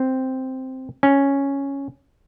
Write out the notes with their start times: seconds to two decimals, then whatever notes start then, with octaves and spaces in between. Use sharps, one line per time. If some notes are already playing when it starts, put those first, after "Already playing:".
Already playing: C4
1.03 C#4